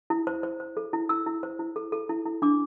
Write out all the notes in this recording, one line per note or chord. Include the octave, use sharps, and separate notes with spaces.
E4
C5
C5
C5
A4
E4
E4 E6
E4
C5
E4
A4
A4
E4
E4
D4 D6